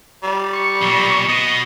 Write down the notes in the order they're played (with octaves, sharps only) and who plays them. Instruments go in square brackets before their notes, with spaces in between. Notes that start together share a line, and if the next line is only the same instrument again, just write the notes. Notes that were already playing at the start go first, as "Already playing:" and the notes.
[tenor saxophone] G3
[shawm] C#6
[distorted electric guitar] B1 A#2
[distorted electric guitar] B2 B3 [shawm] D#5